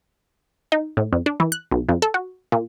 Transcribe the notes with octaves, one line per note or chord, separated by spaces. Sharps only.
D#4
A2
F2
D4
E3
F#6
B1
F2
A4
F#4
A#2